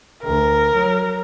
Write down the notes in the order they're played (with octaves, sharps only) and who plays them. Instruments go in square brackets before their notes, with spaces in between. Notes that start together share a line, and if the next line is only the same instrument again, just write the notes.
[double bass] D2 [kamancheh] A#4
[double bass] F#3